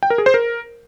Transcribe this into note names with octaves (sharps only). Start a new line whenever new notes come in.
G5
A#4
G#4
C5
A#4